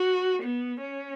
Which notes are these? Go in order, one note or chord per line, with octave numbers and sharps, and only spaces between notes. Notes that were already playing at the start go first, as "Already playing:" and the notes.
Already playing: F#4
B3
C#4